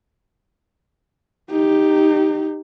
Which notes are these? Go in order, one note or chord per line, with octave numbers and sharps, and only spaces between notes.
D#4 G4